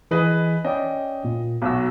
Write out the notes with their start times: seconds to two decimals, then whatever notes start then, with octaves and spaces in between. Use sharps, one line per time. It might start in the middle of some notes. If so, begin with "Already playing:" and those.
0.11 E3 G#4 B4 D#5
0.65 C#4 D5 D#5 G5
1.24 A#2
1.62 B1 F#4 G#5 E6